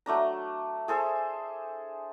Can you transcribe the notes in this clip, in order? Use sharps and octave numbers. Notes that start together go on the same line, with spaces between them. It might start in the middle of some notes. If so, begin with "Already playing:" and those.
F#3 A3 D4 A#5
G#4 A4 C5 E5